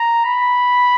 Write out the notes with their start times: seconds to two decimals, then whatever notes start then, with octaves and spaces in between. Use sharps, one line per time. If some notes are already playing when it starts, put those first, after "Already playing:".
Already playing: A#5
0.25 B5